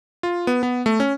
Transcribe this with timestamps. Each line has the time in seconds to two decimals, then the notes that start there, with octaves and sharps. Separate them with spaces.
0.23 F4
0.47 B3
0.63 B3
0.86 A3
1.00 C#4